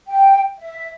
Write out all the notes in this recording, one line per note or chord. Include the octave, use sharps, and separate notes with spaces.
G5
E5